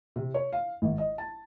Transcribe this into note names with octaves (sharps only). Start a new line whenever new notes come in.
C3
C#5
F5
G#1
D#5
A5